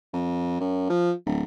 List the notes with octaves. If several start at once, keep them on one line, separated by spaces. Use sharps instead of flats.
F2
F#2
F3
D1